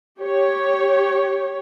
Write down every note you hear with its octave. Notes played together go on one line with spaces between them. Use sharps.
G4 C#5